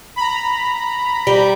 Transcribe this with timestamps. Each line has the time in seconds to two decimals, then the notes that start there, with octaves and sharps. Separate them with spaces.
0.16 A#5 B5
1.27 G3